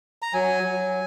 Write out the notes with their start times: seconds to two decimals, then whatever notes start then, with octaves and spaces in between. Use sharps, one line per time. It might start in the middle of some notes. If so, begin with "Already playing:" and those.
0.22 A#5
0.33 F#3 G#5
0.63 F#3